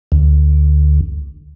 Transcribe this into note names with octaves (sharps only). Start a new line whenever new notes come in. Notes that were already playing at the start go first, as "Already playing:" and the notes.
D2